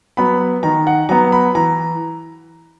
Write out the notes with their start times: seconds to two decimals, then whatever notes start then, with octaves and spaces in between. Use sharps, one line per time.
0.17 F#3 B3 B5
0.63 D#3 A#5
0.87 F#5
1.09 F#3 B3 A#5
1.32 B5
1.55 E3 A#5